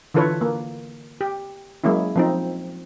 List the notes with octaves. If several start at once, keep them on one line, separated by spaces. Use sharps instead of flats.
D3 E3 F4 A4 B4 C#5
A#3
G4
F#3 G#3 A#3 C#4 E4
F3 C4 D#4